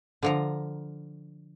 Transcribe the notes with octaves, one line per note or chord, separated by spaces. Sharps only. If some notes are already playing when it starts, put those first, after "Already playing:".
D3 F3 A#5